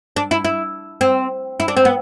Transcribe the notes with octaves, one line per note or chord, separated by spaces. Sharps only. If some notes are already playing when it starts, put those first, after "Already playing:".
D4
E4
E4
C4
E4
D4
C4
B3